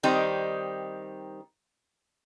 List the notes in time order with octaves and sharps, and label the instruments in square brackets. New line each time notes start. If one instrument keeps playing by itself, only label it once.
[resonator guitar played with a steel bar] D#3 G3 C4 D#4